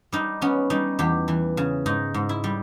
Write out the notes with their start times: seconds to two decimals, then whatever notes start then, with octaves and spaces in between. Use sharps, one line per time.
0.12 G3 D#4
0.41 B3 C#4
0.70 G3 D#4
0.99 E2 G4
1.28 E3
1.57 C#3
1.86 G#2 D#4
2.14 G#2
2.29 E4
2.44 G3